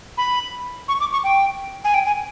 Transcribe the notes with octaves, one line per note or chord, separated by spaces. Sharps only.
B5
C#6
D6
C#6
G5
G#5
G5
G#5